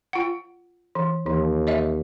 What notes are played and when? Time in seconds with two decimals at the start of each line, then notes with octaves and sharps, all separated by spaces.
0.13 F4 F#5
0.95 E3
1.26 D#2 E3
1.67 C#5 D#5 E5